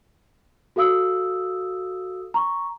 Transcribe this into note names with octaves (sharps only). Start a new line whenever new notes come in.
F#4 A4 F5 D#6 E6
A#5 C#6